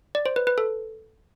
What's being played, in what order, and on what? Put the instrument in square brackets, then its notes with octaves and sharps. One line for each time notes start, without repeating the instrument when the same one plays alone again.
[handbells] D5
C5
B4
B4
A4